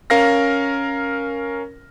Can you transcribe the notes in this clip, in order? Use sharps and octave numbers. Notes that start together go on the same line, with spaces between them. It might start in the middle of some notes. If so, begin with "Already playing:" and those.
C#4 A#4 F5 F6 A#6